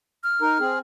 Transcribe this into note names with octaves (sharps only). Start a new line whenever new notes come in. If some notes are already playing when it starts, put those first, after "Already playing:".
F6
D#4 A#4
C4 G#4